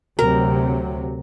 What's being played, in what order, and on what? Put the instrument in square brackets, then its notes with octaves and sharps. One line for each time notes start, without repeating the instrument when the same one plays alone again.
[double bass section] D2 C3 F#3 [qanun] A#4